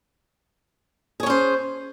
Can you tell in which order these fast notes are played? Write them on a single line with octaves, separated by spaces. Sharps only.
G#4 C#5 C#4 C5